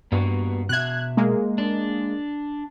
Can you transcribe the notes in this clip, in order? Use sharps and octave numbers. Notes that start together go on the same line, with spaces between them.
G2 A#3 B3 F#4
B2 E5 F#6 G#6
G#3 A#3
D4